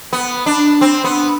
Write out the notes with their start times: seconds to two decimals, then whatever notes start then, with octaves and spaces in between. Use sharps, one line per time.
0.13 B3
0.46 D4
0.81 C4
1.04 B3